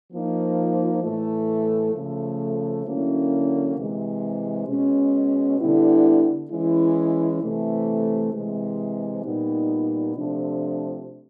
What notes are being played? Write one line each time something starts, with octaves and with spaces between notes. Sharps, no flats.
F3 A#3 D#4
A2 E3 A3
C#3 F3 A3
D3 F#3 A#3 C#4 E4
C3 E3 G#3
B2 G#3 C#4
D3 G3 B3 E4
E3 G#3 C#4 E4
C3 E3 A3
C3 E3 G#3
A#2 G3 B3 D#4
C3 F3 A3 D4